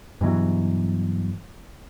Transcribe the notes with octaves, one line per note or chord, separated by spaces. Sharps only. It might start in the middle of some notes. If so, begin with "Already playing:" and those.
G2 B2 E3 F#3